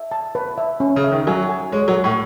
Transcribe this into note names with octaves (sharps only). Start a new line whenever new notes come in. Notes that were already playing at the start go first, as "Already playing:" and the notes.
Already playing: E5
A5
B4
E5
C#4
C#3
E5
D#3
F#3 G#5
G#5
G#3 C#5
F#3
G#4
A2